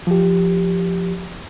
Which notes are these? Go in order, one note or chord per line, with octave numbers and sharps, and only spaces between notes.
F3 G4